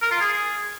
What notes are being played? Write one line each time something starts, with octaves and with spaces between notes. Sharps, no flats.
A#4
F4
G#4